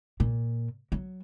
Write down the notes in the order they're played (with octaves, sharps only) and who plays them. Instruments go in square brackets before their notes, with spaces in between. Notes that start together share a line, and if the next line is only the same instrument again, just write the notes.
[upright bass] A#2
F#3